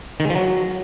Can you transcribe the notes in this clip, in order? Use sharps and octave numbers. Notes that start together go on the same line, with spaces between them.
D#3
G#3
F3
F#3